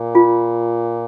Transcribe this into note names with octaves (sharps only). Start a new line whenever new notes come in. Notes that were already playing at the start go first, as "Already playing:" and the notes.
Already playing: A#2
F4